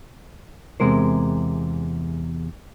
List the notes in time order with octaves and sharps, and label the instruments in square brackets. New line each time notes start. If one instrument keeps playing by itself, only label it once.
[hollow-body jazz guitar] E2 G#2 C3 G#3 A#4 C5